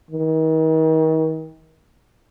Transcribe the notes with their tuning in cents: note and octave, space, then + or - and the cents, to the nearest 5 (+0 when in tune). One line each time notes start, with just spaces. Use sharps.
D#3 +40